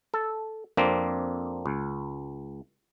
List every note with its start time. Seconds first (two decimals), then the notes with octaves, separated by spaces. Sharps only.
0.14 A4
0.77 F2 A#3 C4 D4
1.66 C#2